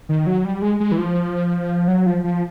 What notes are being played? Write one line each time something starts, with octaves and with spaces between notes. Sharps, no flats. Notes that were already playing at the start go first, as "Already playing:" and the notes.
D#3
F#3
G3
G#3
G#3
E3
F3
F#3
F3
F3